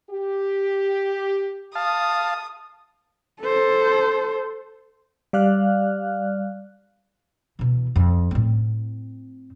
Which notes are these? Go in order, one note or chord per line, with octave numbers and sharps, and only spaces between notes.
G4
F5 A5 D#6
A4 C5
G3 D5 F5 F6 F#6
B2 E3
F2
A2 C4